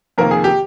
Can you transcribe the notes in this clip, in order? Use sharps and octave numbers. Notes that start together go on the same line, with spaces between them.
F2 C3 D#3 A#3 A#4
G#4
G4